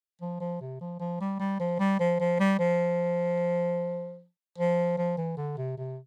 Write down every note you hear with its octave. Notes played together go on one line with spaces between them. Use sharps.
F3
F3
C3
F3
F3
G3
G3
F3
G3
F3
F3
G3
F3
F3
F3
E3
D3
C3
C3